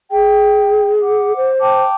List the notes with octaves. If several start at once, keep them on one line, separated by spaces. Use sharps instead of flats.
G#4 G5
F#5 D6
C5
G5 A5 D6